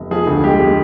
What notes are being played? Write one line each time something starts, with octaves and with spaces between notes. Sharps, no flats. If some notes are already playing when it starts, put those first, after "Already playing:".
Already playing: F1
F3 G#4
D2
G#3 G4
G#3